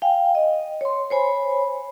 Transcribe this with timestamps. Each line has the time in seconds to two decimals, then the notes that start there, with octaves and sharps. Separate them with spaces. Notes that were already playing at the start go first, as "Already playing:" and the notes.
0.02 F5 G5 G#5
0.35 D#5
0.81 C#5 C6
1.10 C5 C#5 G#5 B5